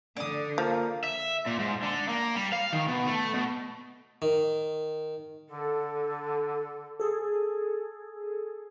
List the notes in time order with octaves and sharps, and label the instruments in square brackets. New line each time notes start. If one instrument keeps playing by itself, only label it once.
[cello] D3 [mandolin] D5 D#6
[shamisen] F3 [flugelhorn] A#3
[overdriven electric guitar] E5
A#2
G#2
D3
A#3
G3
F5
D#3
B2
A3
B2
[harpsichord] D#3
[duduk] D3 [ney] A4
[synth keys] G#4 A4